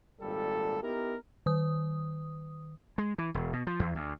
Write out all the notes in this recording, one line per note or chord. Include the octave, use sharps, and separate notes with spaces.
G#1 A#2 G3 A4
B3 D#4 E4 G4 A#4
D#3 D#6
G#3
E3
E1
B2
F3
E2
D2